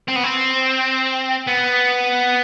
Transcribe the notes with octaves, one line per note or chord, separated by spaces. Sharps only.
C4
B3
C4
B3